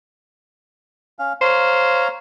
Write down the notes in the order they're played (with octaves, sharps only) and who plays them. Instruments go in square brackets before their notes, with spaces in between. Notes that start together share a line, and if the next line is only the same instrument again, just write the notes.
[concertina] C#4 F5
[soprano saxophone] C5 [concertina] C#5 F5 A#5